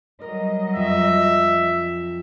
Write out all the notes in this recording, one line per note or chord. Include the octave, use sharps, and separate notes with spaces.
F#3 G3 A#4 D#5
F2 F3 E5